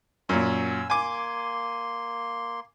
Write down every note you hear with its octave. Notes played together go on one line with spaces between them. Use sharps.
F#2 A#2 G#5 E6
A#3 G#5 C6 D6